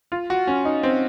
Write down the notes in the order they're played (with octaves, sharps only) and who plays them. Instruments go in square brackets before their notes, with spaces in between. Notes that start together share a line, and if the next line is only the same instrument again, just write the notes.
[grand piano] F4
F#4
C#4
D#4
C4